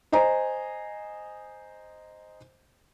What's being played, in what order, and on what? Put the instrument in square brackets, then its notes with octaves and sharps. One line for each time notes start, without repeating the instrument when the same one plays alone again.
[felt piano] C5 D#5 G#5 A#5